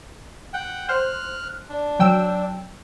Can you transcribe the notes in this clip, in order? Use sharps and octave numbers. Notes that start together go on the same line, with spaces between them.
F#5 G5
C5 F6 F#6
D4
F#3 G5 E6